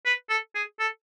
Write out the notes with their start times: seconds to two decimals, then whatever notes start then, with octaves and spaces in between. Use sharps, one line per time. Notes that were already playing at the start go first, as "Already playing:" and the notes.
0.06 B4
0.30 A4
0.55 G#4
0.80 A4